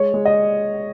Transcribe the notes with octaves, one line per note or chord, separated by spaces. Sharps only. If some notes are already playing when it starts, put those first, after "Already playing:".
Already playing: G#3 C#5
G#3
D#5